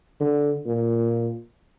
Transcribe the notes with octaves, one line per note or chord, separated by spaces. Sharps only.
D3
A#2